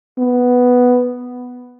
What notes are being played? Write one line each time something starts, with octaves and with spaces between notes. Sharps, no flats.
B3